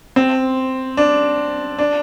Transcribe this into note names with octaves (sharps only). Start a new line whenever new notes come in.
C4
D4
D4